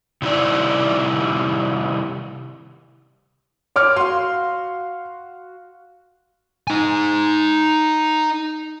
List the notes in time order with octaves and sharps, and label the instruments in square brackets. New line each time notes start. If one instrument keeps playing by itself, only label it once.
[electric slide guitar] C3 D#3 G3 E4 D5
[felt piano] C#5 D6 F6
[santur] F#4 F5 [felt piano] C6
[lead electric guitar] D#4 G#5